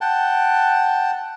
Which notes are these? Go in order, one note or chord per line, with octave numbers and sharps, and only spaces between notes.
F#5 G5 A5